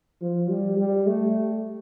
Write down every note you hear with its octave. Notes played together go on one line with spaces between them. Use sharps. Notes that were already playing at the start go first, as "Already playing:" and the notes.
F3
G3
G3
A3